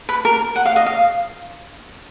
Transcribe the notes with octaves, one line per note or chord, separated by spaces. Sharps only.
B4
A#4
F#5
F5
D#5
F5